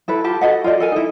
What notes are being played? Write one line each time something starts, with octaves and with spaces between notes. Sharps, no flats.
E4 A4 B4
F4 G4 A5
F#4 A4 D#5 F#5
F4 G#4 D5 D#5
A4 A#4 G#5
D#4 E4